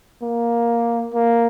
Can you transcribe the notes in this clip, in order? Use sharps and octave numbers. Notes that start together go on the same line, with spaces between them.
A#3
A#3